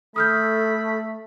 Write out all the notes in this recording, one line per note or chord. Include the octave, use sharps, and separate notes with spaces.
A3 A4 B5 D#6 F6 G6